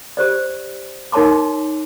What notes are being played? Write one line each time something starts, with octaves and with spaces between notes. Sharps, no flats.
G4 C5 D5
D#4 A#4 C#5 A5 C6 D6